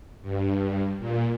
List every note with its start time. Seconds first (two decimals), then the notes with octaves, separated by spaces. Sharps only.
0.22 G2
0.99 A#2